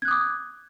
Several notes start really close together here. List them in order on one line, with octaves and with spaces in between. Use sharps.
G#6 F#6 D#6 D6